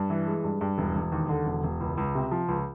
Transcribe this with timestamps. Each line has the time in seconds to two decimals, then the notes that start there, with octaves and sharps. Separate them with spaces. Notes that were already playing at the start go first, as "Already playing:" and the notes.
Already playing: G2
0.10 E3
0.27 G#3
0.44 G2
0.61 G2
0.78 E1
0.96 E1
1.12 D#2
1.29 D3
1.46 E1
1.63 E1
1.80 C#2
1.98 C#2
2.15 C3
2.31 F3
2.48 C#2